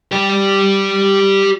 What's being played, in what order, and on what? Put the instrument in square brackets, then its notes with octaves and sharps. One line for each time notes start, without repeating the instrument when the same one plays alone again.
[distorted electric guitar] G4 D5